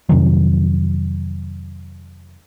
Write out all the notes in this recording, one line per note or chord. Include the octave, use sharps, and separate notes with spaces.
F2 C3 D#3 F#3